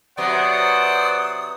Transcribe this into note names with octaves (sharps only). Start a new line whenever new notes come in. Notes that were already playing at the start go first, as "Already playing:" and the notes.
C3 F#3 B3 C5 D5 F#5 D#6